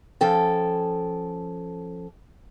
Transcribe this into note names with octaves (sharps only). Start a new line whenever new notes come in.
F3 C#4 A4 G5